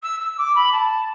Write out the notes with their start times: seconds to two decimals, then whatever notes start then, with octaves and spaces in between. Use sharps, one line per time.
0.03 E6
0.20 E6
0.37 D6
0.55 B5
0.72 A5